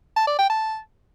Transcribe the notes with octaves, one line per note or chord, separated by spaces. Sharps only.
A5
D5
G5
A5